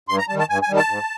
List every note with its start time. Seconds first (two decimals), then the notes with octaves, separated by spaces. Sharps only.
0.09 G2 C6
0.19 A#5
0.29 D#3 G3 A5
0.39 A5
0.49 G2 G#5
0.62 G#5
0.69 D#3 G3
0.76 A5
0.89 G#2